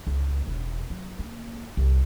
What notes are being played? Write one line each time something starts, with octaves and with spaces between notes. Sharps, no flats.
C#2
E1
F#3
A#3
C2